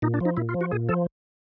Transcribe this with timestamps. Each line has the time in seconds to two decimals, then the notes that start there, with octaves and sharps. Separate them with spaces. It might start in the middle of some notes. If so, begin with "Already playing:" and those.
0.02 A#2 D#4
0.14 D4
0.20 F3 D#4
0.37 A#2 E4
0.49 F4
0.54 F3
0.61 F#4
0.71 A#2 G#4
0.89 F3 A4